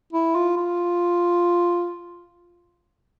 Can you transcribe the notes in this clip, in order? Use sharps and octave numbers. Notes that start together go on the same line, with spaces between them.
E4
F4
F4